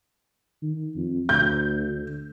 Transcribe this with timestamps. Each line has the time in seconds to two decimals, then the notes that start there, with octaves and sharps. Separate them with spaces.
0.62 D#3
0.96 F2
1.29 D2 G6